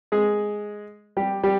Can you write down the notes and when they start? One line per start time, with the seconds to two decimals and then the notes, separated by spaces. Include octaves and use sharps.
0.12 G#3 G#4
1.17 G3 G4
1.43 G3 G4